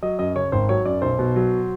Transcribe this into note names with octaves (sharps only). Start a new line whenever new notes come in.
F#3 D#5
F#2 D#5
C#3 C#5
G#1 C5
F#3 C#5
F#2 D5
B1 C5
B2
F#3